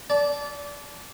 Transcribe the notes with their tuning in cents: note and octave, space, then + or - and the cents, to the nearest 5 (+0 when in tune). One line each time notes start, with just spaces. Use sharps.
D5 -20 A5 -20